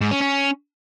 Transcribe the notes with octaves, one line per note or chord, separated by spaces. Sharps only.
G#2
C#4
C#4